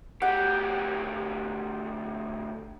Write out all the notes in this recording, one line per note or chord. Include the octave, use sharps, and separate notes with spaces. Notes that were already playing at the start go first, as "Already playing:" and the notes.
D2 G4 F#5